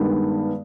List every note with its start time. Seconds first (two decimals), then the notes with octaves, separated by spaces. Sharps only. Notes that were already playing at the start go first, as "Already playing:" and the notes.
Already playing: G2 D#3 G#3 B3